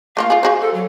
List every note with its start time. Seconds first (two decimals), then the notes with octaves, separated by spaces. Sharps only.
0.17 A3 A#3 F4 F5
0.30 F4 G#4
0.43 F#4 G#4 C5
0.61 A4
0.74 F#3